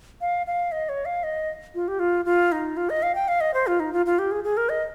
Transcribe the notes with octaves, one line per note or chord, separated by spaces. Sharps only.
F5
F5
D#5
C#5
F5
D#5
F4
G4
F4
F4
D#4
F4
D#5
F5
G5
F5
D#5
C5
F4
D#4
F4
F4
G4
G#4
G#4
A#4
D#5